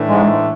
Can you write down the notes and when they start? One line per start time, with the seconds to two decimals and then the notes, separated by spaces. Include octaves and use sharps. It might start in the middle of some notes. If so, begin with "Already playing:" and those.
Already playing: A2 E3 A3 D4
0.09 G#2 G#3